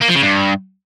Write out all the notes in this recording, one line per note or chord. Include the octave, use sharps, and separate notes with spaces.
A#3
F3
C#3
G2